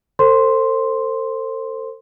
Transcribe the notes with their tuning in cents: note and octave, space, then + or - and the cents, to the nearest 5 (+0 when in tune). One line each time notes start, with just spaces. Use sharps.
A4 +40 C5 +15 C6 +0